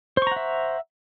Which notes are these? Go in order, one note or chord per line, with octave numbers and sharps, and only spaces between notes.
C5 E5 F#5 A#5 C#6